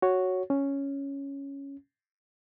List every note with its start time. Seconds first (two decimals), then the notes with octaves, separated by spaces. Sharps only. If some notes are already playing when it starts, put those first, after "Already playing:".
0.02 F#4 C#5
0.50 C#4